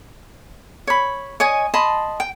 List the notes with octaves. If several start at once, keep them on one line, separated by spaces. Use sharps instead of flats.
C#5 B5
C#5 D#5 G#5
D#5 A5 B5 C6
G5